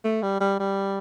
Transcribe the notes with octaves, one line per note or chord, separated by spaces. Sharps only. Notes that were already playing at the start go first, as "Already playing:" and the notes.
A3
G3
G3
G3